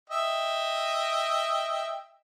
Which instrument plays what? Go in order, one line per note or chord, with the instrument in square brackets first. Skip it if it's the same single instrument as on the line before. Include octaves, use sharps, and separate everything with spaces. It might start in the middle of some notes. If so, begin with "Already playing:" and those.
[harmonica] D#5 E5 G5